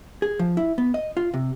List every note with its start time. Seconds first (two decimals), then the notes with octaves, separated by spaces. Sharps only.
0.22 G#4
0.39 F3
0.57 E4
0.78 B3
0.94 D#5
1.17 F4
1.34 C3